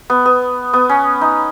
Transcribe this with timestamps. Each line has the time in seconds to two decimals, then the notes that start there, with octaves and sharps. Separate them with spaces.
0.10 B3
0.26 B3
0.73 B3
0.89 C#4
1.21 D#4